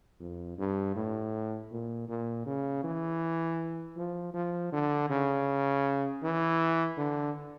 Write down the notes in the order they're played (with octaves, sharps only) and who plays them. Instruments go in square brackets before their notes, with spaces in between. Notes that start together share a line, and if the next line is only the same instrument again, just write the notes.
[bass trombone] F2
G2
A2
A#2
A#2
C#3
E3
F3
F3
D3
C#3
E3
D3